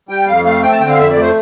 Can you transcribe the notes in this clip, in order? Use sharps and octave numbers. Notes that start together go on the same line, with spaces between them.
G3 G5
F2 F5
A3 F5
C4 G5
A5
D3 G5
F5
F2 E5
D5
A3
C5